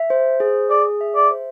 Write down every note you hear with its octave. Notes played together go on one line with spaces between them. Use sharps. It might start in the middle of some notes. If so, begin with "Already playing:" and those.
Already playing: E5
C5
G#4
G#4 D5
E5
D5
C5